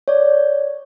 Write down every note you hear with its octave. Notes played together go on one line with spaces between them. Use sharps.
C#5 D5